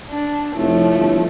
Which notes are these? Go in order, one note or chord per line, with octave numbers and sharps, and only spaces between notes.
D4
F1 F3 A3 E4 F4 C#5
G1